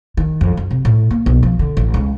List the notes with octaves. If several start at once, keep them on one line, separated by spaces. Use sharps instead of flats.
D#3
F2
F#2
C3
A2
A#3
B1
F3
D3
A1
C#2